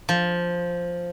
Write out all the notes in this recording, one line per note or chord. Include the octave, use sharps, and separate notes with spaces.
F3